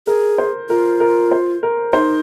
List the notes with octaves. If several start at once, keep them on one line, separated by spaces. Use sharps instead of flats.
G#4 A#4
C5
F4 A#4
A#4
C5
A#4
D#4 C5